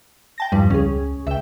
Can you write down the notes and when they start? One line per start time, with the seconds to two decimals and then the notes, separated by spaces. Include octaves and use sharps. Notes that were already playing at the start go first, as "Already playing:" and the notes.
0.38 G5 A5 A#6
0.52 E2 G2 F3 G3
0.70 C#2 C#4 G#4
1.27 C#2 E5 G5